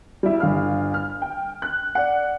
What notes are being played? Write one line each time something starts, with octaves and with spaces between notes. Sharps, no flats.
G3 E4
G1 F5 F6
F6
G5
F#6
D5 F#5